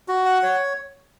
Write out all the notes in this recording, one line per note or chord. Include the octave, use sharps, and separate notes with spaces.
F#4
F#5
C#5